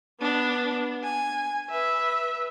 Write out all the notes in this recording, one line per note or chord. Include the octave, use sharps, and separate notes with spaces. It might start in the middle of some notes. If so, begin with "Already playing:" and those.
B3 D4
G#5
B4 E5